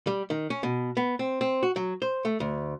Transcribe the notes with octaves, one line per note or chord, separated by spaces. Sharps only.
G3
D#3
C#4
B2
B3
C4
C4
F#4
F#3
C5
A3
D2